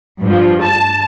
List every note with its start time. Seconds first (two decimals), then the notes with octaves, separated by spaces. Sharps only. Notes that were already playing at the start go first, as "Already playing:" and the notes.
0.19 G2 F3
0.61 A5